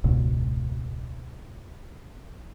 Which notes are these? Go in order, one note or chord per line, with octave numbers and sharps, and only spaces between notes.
E1 C#2 G#2 B2